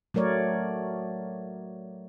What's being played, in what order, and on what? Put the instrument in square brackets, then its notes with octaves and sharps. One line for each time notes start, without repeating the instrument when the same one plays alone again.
[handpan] F#3 A3 A#4 C#5 D5